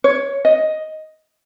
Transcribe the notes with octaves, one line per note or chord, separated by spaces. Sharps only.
C#5
D#5